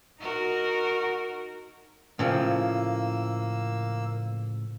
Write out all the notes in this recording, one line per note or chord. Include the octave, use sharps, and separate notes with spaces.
D#4 F#4 A#4
A2 C#3 F3 A#3 E6